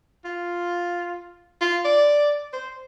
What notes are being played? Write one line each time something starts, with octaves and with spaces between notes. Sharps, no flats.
F4
F4
D5
C5